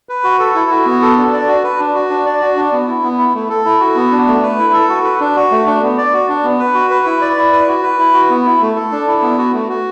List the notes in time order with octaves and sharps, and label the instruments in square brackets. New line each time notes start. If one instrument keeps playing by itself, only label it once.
[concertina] B4
F#4
A4
E4
F#4
B3
A4
D4
D5
F#4
B4
D4
F#4
D4
D5
F#4
D4
B3
E4
B3
E4
A3
A4
E4
F#4
B3
D4
A3
B4
E4
A4
F#4
B4
D4
F#4
A3
D4
B3
D5
F#4
D4
B3
B4
F#4
B4
E4
D5
E4
B4
F#4
B4
E4
F#4
B3
E4
A3
A4
D4
E4
B3
F#4
A3
F#4